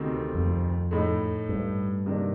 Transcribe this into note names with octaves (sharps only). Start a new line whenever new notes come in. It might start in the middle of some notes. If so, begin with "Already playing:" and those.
Already playing: D2 C3 D#3 A3 C4
F2
A2 A3 D#4
G2
C3 D#3 A#3 D4